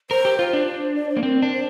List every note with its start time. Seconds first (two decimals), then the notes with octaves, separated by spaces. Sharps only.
0.10 A#4 C5
0.25 G4
0.39 F4 C5
0.53 D4
0.66 C5
0.81 C5
0.95 D5
1.09 C5
1.17 A#3
1.23 C4 A#4
1.42 D4
1.52 C5